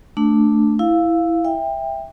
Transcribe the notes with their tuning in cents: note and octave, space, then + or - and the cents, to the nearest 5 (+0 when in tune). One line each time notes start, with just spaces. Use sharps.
A3 +5 D4 +0
E4 +0 F5 +0
E5 +0 G5 +20